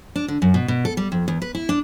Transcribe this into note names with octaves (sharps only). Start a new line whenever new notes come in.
D4
D3
F#2
B2
B2
A4
G3
F2
E2
B4
E4
D4